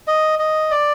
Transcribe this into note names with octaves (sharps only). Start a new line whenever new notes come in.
D#5
D#5
D5